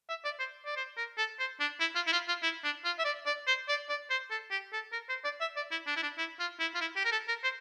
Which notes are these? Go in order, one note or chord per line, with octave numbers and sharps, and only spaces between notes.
E5
D5
C5
D5
C5
A#4
A4
C5
D4
E4
F4
E4
F4
F4
E4
D4
F4
E5
D5
D5
C5
D5
D5
C5
A4
G4
A4
A#4
C5
D5
E5
D5
E4
D4
E4
D4
E4
F4
E4
F4
E4
G4
A#4
A4
A#4
C5